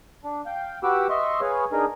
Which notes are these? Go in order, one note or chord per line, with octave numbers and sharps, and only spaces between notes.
D4
F5 G5
F#4 G4 B4 F#5 D6 E6
D#5 E5 C6 C#6
G#4 B4 C#5 F5
D4 D#4 G#4 A#4